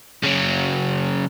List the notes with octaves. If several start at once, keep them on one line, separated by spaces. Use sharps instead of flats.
C#3 F#3